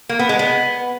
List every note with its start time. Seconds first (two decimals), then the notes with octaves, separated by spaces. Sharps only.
0.09 A#3
0.19 B3
0.29 G#3
0.39 B3